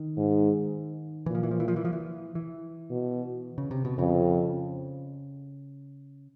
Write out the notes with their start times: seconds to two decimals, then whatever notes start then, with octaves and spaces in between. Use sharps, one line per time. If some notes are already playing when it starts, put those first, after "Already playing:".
Already playing: D#3
0.17 G#2
1.26 A#2 E3
1.35 F3
1.43 E3
1.51 F3
1.60 E3
1.68 F3
1.76 E3
1.85 F3
1.93 E3
2.35 E3
2.90 B2
3.58 C#3
3.71 C3
3.85 B2
3.98 F2 C#3